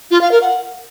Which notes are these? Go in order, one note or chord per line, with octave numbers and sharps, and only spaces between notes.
F4
F5
A#4
F#5